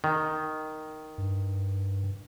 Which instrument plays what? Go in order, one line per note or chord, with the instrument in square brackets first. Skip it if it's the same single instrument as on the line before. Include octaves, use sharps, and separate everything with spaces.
[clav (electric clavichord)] D#3
[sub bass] G2